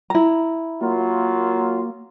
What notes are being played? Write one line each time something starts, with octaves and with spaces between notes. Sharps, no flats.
E4 A#5
F#3 A#3 F4